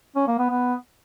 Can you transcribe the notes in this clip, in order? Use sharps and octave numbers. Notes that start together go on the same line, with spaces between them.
C#4
A#3
B3
B3